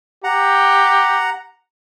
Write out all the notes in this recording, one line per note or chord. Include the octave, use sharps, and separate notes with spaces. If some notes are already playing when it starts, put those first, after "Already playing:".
G4 F#5 A#5